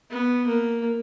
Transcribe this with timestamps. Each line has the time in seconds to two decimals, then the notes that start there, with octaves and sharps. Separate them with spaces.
0.11 B3
0.47 A#3